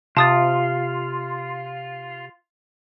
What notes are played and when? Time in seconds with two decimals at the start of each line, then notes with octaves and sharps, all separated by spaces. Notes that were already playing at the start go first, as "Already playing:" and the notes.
0.17 C3 F4 A5 D#6 A6